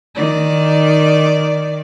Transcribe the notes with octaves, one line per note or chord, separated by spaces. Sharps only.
D#3 D5